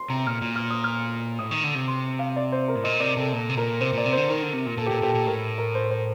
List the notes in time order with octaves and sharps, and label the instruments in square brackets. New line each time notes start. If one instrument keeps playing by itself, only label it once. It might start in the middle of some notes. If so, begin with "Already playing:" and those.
Already playing: [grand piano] C6
[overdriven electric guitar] C3 [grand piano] A#5
[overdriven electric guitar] A#2 [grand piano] F6
[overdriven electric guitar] A#2
[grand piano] F6
D#6
F6
[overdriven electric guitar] A2 [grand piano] D#6
[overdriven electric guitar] D#3
D3
C3
[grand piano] C6
F5
D5
C5
A#4
[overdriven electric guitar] A2
[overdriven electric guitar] A#2 [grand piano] D#5
[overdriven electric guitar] C3 [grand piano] D5
[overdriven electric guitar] C3 [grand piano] A4
[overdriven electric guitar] A#2 [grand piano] A4
[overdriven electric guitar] C3
[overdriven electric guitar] A#2 [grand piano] A#4
[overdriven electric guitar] C3 [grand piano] C5
[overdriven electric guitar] A#2 [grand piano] D5
[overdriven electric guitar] C3
[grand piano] C5
[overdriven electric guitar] D3
[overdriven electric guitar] D#3 [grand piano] A#4
[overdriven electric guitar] D3
C3
A#2
[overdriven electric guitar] A#2 [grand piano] A4
[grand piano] G4
[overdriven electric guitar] A#2
[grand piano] A4
[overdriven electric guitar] A#2 [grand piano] G4
[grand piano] A4
[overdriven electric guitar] A#2
[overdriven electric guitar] A2 [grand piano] A#4
[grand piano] A#4
C5
C5